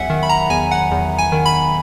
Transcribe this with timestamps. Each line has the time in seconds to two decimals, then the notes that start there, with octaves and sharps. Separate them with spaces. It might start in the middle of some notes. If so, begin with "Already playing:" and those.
Already playing: E2 F#3 E5 F#5 G#5
0.10 D#3
0.23 B5
0.29 A#5
0.50 E2 G#5
0.71 F#5
0.91 E2
1.19 G#5
1.32 D#3
1.46 B5